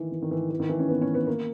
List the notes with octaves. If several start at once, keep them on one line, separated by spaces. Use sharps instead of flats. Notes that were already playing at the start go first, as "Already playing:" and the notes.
Already playing: D#3 E3
E3
D#3
E3
E3
D#3
E3
C#4
B3
C#4
B3
A#3